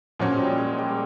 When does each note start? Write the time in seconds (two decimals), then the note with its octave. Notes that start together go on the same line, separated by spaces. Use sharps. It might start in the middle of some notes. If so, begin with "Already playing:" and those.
0.19 A#2 F3 F#3 A#3 C#4 F#4
0.34 G3 G#3
0.58 G#3
0.78 G3
0.88 G#3